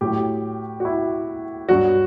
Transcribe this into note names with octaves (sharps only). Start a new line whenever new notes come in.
A2 F#3 G4
F#4
E4
G2 F#3 F#4